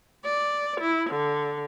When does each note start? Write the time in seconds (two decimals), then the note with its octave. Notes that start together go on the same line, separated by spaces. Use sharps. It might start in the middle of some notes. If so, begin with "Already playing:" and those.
0.25 D5
0.81 E4
1.11 D3